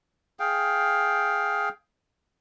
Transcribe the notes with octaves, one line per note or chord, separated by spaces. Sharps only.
G#4 F5 G5